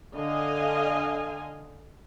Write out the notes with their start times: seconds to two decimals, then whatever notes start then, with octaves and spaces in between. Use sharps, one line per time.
0.15 D3 D#5 F5 G#5